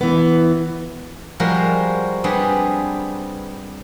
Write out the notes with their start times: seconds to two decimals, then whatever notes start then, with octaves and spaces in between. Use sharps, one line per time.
0.01 E3 B3
1.40 F3 G3 G#3 F#4 A#4 C5
2.24 G3 B3 C4 D4 G#4